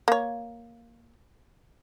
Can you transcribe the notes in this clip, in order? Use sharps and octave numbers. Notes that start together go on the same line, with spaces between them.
A#3 C#5